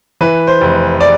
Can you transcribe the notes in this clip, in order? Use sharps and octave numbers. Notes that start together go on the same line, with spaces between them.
E3 B4
C5
F1
D5